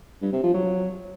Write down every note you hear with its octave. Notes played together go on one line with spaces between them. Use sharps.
G2
C3
F3
F#3